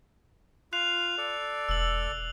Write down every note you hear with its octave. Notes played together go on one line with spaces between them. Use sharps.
F4 F#6 C7 F7
A4 D5
E1 E6 F#7